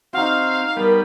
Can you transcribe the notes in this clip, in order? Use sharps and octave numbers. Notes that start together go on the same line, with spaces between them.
C4 D#4 F#4 F5
G3 B3 A#4